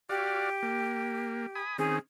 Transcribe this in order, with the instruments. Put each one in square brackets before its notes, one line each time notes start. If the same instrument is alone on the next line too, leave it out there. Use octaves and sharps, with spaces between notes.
[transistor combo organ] F#4 D5 F5 [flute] G4
[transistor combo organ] A#3
G#5 B5 D#6
[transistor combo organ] D#3 C4 C#4 [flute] G#4